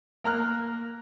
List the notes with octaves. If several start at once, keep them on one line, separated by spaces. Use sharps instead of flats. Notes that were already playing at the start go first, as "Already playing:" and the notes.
A#3 A#5 F6 F#6